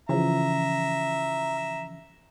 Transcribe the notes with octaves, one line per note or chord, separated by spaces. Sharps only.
C#3 E3 F3 E5 A#5